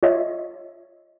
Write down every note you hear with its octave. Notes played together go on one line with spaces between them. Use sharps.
F4 C#5 D#5 E5